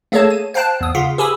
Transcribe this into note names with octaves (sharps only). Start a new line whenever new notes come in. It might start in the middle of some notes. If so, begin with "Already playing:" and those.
A3 A#3 G#4 A4 C#5 A5
D#7
C5 F5 G5 A5 F#6
E2 D#6
C#3 F4 F5 F#5 B6
G4 G#4 G#5 B5 D#6 E6